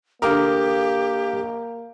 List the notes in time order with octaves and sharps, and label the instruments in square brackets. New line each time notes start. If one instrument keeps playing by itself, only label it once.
[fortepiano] D3 A#4 [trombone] A#3 [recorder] G4 [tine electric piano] F5 D6 D#6